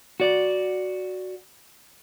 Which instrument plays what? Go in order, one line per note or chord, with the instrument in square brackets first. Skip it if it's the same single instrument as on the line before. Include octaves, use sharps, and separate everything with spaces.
[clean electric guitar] F#4 D5